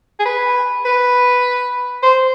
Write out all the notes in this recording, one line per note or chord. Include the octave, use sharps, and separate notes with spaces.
G#4
B4
B4
C5